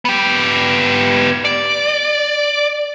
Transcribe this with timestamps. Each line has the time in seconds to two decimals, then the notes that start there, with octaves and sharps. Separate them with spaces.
0.05 B3 G4
1.45 D5